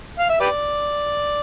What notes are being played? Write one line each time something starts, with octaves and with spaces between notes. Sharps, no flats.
F5
E5
G4 B4 D5